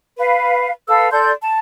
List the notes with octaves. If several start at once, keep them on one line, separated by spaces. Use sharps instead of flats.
B4 F5
A4 B4 F5 E6
A4 D5 C6 G6
A5